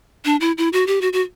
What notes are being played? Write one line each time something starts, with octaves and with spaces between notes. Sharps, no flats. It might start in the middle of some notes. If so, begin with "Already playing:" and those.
D4
E4
E4
F#4
G4
F#4
F#4